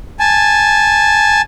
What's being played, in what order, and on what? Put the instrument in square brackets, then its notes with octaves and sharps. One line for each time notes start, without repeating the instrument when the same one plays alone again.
[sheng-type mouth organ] G#5 A5